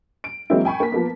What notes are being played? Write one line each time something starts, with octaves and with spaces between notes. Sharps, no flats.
D7
E3 F#3 G#3 A#3 C4 E4
G5 G#5 B5 C#6
A#3 B6
F3 A#3 B3